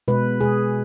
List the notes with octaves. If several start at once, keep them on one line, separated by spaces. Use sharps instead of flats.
B2 G#3 B4
B2 G#3 G#4